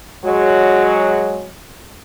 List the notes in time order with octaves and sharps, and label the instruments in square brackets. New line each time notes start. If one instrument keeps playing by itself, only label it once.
[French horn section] F#3 G#3 F#4